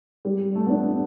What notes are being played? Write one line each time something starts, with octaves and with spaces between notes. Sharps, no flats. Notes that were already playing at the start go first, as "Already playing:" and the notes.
G3
A3
B3
D4